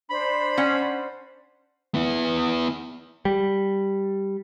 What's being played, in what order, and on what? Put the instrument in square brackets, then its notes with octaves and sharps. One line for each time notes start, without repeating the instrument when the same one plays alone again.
[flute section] D4 C5 [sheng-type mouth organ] B5
[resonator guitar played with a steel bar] C#4 F#5
[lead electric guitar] B3 E4
[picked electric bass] G3